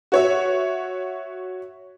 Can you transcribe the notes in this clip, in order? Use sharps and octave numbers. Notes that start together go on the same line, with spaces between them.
F#4 C#5 E5